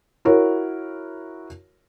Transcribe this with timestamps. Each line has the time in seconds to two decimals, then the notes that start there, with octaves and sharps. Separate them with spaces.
0.25 E4 F#4 A#4 C#5